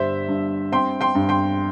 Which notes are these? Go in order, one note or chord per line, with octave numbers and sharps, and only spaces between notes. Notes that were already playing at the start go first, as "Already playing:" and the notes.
Already playing: G1 G3 D4 C5 E5
G2
C4 G5 C6
G5 C6
G2
G5 C6